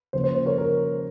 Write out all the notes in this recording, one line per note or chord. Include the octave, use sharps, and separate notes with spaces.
C#3 F3 A#3 C5
C5
C5
A#4 C#5
A#4